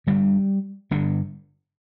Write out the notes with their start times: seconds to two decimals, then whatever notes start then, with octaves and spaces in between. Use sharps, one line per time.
0.07 G1 G2 D3 G3
0.91 G1 G2 D3